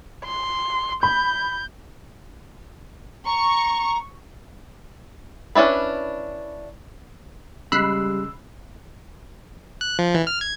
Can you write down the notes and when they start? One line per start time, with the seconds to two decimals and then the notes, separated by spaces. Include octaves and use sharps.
0.24 C6
1.03 B5 G6
3.25 A#5 C#6
5.55 C#4 D4 E4 B4
7.72 C#3 G3 G#3 B5 E6 F#6 C7
9.81 F#6
9.99 F3
10.14 E3
10.27 F6
10.41 G#6